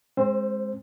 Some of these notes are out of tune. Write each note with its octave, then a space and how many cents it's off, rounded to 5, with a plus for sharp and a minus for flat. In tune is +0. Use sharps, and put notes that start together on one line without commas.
G#3 +0 C4 +35 C5 -5